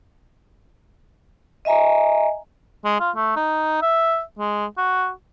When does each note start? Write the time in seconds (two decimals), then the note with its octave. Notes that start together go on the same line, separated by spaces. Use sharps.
1.65 D#5 E5 G#5 A#5
2.85 G#3
3.00 F4
3.16 A3
3.36 D#4
3.82 E5
4.38 G#3
4.78 F#4